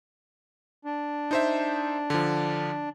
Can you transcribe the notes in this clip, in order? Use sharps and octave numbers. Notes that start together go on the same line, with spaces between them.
D4
D#4 C5 E5
D3 F3